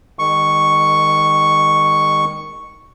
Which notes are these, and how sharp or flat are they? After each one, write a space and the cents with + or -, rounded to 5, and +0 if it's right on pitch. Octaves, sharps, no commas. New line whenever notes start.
D#3 +0 G#3 -35 C#6 +0